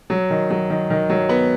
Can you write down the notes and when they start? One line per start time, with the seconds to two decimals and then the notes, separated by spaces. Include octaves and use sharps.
0.10 F#3
0.30 D#3
0.50 F#3
0.70 D#3
0.90 D#3
1.10 F#3
1.29 B3